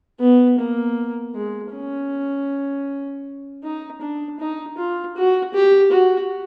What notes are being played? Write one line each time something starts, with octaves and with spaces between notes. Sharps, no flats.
B3
A#3
G#3
C#4
D#4
D4
D#4
F4
F#4
G4
F#4